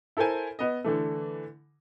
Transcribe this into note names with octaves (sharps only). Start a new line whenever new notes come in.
E4 A4 A#4 C5 G#5
B3 D#5
D3 E3 A3